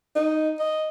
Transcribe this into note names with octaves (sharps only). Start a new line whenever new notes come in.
D#4
D#5